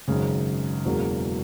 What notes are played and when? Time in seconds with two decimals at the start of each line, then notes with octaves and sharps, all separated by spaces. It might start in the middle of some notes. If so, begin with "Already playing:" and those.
0.08 G#1 F#2 C#3
0.85 E1 E2 C#3 F#3 A#3